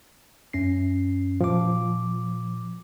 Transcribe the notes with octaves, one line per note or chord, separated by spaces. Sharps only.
F#2 C#4 C7
A#2 F3 D6